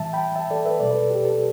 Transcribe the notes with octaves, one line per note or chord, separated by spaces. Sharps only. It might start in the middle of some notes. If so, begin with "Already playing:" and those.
Already playing: A2 E3 G3 E5 A5
G5 B5
E5 A5
A4 D5
B4 E5
B2 G3 A4 D5
B4
A4
G4
A4